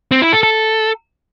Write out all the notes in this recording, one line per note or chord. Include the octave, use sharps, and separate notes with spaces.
C4
E4
A4
A4